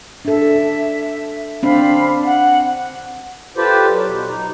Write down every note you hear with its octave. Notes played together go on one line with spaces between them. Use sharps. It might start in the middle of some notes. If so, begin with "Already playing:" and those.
D4 A4 E5
C4 D4 F5 B5
F#5
F4 G4 A4 B4 C5 D5
F#3
B2
D#4